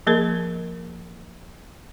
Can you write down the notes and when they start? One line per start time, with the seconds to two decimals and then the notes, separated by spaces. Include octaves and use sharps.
0.07 F3 A#3 G#4 A#4